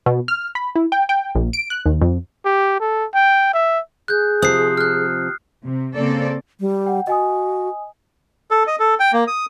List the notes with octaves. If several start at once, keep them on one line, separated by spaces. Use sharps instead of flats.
B2
F6
B5
E4
G5
G5
A#1
D7
F#6
D#2
F2
G4
A4
G5
E5
G#4 F#6 G6
C3 F3 C4 D#6 F#6 C7
F6 F#6
C3
C#3 A#3 C4 A4 D5
G3
F#5 G5
F#4 D#5 G#5 D#6
A4
D#5
A4
G5
A#3
D#6